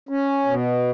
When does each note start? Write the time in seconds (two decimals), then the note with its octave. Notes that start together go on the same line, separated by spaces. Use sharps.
0.09 C#4
0.46 B2